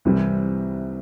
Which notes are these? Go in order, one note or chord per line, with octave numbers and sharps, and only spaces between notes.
C2 C3 E3 G3